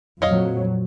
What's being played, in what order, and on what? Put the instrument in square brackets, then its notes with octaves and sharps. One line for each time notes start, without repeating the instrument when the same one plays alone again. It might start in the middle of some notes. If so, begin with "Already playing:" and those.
[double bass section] F2 A#2 F#3 [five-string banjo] C#5 D#5 F5